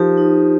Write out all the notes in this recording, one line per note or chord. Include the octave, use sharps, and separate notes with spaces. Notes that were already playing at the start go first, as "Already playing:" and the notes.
Already playing: F3 D#4 G4 A#4
D#4